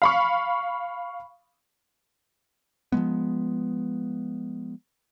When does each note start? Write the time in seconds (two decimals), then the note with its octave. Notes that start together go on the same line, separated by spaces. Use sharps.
0.02 F5 B5 C#6
2.92 F3 F#3 G#3 B3